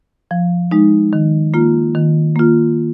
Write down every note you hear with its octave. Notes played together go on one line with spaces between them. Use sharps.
F3
G#3 D#4
D#3
A#3 F4
D#3
A#3 F4